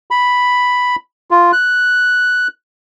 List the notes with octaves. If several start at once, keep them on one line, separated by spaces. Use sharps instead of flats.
B5
F4
F#6